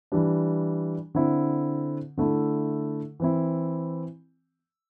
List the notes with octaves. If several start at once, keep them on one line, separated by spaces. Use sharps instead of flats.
E3 G3 D4
D3 C4 E4
D3 A3 E4
E3 C4 E4